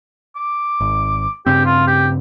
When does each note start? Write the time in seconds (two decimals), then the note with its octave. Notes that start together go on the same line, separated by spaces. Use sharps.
0.36 D6
0.81 G#1
1.46 G2 C#3 C4 G4
1.65 F4
1.87 G4